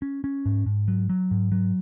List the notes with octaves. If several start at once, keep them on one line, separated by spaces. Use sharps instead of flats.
C#4
C#4
G#2
G#2
F#3
F#3
G#2
F#3